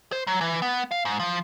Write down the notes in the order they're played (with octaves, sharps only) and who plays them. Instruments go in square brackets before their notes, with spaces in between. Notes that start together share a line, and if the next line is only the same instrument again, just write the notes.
[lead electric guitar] C5
F#3
E3
B3
F5
G#2
F3